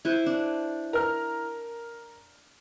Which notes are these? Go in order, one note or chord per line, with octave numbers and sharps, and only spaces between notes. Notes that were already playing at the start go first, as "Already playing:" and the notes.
E4 B4 C5
D4
A#4 F6